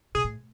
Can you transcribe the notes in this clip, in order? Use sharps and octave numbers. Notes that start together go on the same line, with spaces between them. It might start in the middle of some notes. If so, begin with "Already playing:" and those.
C3 G#4
A2